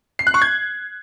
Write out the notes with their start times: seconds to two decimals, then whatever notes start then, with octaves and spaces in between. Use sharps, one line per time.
0.19 C7
0.27 F#6
0.34 C#6
0.42 G#6